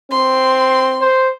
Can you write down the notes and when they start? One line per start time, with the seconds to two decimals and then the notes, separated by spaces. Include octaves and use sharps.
0.11 C4 C6
1.01 C5